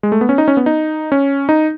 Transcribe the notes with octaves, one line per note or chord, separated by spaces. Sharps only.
G#3
A3
B3
C#4
D#4
C#4
B3
D#4
C#4
D#4